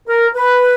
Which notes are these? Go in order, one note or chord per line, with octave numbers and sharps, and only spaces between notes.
A#4
B4